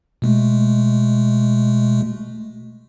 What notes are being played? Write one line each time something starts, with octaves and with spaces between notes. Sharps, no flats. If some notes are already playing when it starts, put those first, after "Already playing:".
B2 G#3 A3